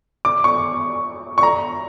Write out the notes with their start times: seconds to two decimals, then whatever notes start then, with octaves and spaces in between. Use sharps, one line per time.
0.25 D6
0.44 C#6
1.38 C#6
1.43 A#5